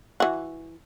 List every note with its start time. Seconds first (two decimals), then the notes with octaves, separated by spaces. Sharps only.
0.20 E3 F#4